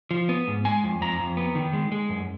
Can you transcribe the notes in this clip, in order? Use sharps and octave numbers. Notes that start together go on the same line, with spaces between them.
F3
B3
G#2
G#3 G#5
F2
F2 A#5
F2
B3
D#3
G#3
G#3
F#2